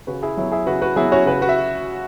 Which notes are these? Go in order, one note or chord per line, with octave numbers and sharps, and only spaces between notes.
C#3 F#4 B4
E4 G#4
F#3 B3 E4
E4 G#4
C#3 F#4 B4
F#4 B4
F#3 B3 E4 G#4
C#4 F#4
C#3 F#4 B4
F#4 B4
E5